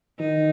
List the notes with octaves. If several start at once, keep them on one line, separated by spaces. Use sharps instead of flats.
D#3 D#4